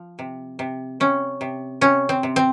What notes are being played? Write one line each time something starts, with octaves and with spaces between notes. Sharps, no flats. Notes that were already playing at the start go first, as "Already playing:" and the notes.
Already playing: F3
C3
C3
C3 C#4
C3
C3 C#4
C4
C3
C4